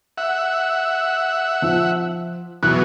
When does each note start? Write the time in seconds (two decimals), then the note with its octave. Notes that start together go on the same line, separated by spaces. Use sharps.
0.18 E5 F#5
1.62 F3
2.63 B2 E3 F#3 F#6